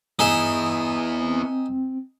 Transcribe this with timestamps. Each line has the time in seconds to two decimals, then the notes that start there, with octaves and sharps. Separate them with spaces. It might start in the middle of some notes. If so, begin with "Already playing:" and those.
0.19 G2 B3 D#4 E4 G#4 E5
1.20 C4